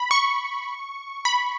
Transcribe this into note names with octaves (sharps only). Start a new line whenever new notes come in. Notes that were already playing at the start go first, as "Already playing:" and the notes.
Already playing: B5
C#6
B5